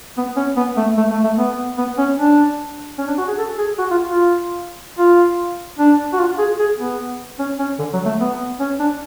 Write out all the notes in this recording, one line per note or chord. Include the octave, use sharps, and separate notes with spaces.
B3
C#4
B3
A3
A3
A3
A3
B3
B3
C#4
D4
C#4
D4
F#4
G#4
A4
G#4
F#4
F4
F4
F4
D4
F#4
F4
G#4
G#4
B3
C#4
C#4
D3
F#3
A3
B3
C#4
D4